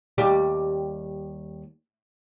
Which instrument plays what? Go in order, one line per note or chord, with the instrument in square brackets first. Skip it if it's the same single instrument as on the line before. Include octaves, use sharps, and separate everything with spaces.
[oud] D#2 G3 G4